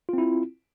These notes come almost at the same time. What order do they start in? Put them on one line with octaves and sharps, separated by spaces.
F4 C4 E4